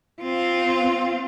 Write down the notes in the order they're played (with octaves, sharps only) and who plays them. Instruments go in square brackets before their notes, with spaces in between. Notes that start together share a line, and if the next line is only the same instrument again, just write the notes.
[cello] C4 F4